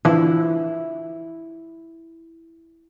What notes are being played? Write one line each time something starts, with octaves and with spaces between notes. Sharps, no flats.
D3 E3 F3 E4